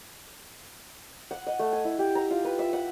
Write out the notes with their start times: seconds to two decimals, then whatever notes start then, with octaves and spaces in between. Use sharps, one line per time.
1.31 F#5
1.47 D#5
1.59 A3
1.73 G#5
1.85 E4
1.99 G4
2.15 A#5
2.30 F4
2.44 B4
2.59 E5
2.73 F#5